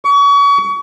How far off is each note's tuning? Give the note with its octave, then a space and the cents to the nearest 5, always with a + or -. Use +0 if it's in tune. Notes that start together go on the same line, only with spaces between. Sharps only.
C#6 +35